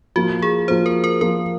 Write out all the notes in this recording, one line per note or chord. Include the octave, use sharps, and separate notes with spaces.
F3 A#3 F4 F#4
G#4
F3 A#3 F4 C5
A#4
A#4
F3 A#3 F4 A#4